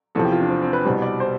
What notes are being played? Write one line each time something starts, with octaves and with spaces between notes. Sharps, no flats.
E2 C3 F3 A4
G4
F4
D4
C4
C4
B4
C2 B2 G3 C5
D5
C5